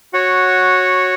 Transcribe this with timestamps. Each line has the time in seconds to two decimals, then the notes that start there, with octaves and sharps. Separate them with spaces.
0.13 F#4 C#5 F#5